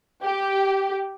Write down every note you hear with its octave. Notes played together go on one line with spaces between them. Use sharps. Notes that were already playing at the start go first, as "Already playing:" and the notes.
G4